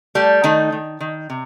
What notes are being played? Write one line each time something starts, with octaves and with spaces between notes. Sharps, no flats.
G3 A3 G4
D#3 A3 D#4
D#3
D#3
C3